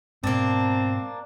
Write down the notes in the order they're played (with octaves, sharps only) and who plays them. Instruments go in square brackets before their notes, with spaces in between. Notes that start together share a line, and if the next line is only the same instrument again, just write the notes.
[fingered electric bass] G#2 B2 [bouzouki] A#3 D4 [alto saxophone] C4